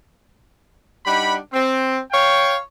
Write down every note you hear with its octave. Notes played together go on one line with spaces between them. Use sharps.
G3 D4 D#4 F#5 B5
C4
C#5 F5 G5